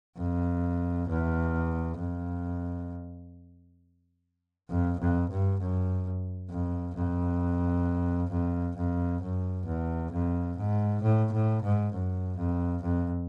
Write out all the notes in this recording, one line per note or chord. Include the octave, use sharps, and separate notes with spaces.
F2
E2
F2
F2
F2
G2
F#2
F2
F2
F2
F2
F#2
E2
F2
G#2
A2
A2
G#2
F#2
F2
F2